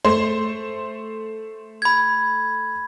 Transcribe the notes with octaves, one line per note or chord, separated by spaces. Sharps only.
A3 C5 C6
B5 G#6